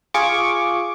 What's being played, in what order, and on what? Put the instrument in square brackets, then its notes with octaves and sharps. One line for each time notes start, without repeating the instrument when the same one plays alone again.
[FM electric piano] F4 G#4 C#6 D6